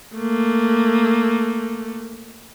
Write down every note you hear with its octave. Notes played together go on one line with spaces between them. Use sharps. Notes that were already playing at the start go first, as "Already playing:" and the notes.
A3 A#3